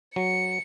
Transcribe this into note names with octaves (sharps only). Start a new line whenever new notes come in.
F#3 C#7